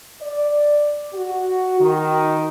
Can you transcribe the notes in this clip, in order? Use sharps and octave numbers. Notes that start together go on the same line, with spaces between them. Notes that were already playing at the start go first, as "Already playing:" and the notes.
D5
F#4
D#3